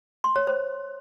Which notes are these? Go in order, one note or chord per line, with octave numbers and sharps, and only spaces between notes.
C6
C#5
C5